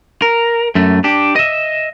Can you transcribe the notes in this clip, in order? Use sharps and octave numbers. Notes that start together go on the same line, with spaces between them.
A#4
F#2 A3
D4 G4
D#5 E5